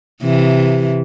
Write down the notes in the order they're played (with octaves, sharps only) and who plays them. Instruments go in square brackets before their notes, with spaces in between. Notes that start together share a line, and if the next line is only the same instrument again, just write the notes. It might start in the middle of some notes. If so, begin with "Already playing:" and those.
[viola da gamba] C3 E3